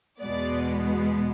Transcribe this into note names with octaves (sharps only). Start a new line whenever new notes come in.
E2 B2 G#3 B3 D5